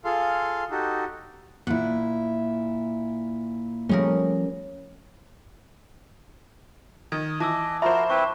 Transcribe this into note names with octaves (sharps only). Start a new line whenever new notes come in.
F4 G#4 A4 F5 C6
D#4 F#4 G4 A4
A#2 E4 F#5
F3 G3 A3 C#4 G#4 A#4
D#3 D#6 G#6
E3 D#5 A5 D6 E6
F3 F#4 A#4 C5 E5 A#5 B5
C4 E4 B4 C#6